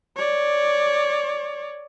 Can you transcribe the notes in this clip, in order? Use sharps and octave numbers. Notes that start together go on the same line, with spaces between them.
C#5 D5